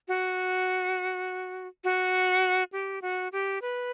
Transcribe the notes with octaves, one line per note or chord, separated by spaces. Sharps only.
F#4
F#4
G4
F#4
G4
B4